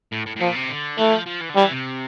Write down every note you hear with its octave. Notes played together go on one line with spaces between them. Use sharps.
A2
A2
A2
A#2 F3
C3
D3
E3 A3
F3
F3
E3
D3
E3 G3
C3